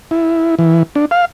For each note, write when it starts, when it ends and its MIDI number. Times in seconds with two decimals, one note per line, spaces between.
0.11 0.55 64
0.59 0.83 52
0.95 1.05 62
1.11 1.25 77